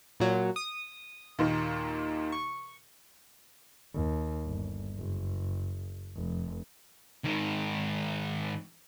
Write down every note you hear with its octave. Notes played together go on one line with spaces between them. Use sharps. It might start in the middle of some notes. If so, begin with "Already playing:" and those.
A#2 F#3
D#6
D#2 A#2 D#3
C#6
D#2
G1
F#1
F1
G#2 D#3